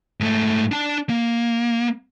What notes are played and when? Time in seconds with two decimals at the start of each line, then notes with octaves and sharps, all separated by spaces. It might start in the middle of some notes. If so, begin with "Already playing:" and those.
0.20 G#2 A3
0.72 D4 A5
1.10 A#3